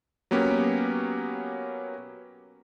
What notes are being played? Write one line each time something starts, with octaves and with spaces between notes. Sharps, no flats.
F#3 A#3 B3 C#4 G4